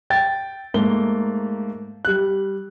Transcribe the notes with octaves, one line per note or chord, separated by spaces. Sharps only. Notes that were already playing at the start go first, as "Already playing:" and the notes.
G5 A6
G#2 A3 A#3 G7
G3 F#6